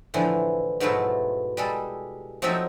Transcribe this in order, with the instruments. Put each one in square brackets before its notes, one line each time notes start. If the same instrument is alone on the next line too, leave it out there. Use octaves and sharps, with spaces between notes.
[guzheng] A2 D3 E3 F3
G#2 B2 F#3 A3 E4 F4
G3 G#3 A4
F3 F#3 C4 D#4 A4 E5